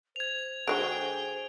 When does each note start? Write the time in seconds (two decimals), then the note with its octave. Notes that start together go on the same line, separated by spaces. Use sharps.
0.16 C5 G#6 F7
0.67 D3 G#3 F#4 G#4 G5 D7